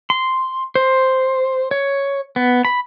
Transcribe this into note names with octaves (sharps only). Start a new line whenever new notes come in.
C6
C5
C#5
B3
B5